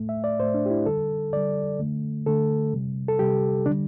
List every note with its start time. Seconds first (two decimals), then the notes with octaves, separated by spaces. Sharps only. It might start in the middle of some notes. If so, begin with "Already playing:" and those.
Already playing: A2 A3
0.09 E5
0.24 D5
0.39 A2 C5
0.43 A3
0.54 D4
0.66 G4
0.70 E4
0.86 D3 G3 A4
1.33 D3 G3 D5
1.79 D3 A3
2.26 D3 A3 A4
2.73 C3 G3
3.08 A4
3.19 C3 G3 G4
3.66 D3 G3 D4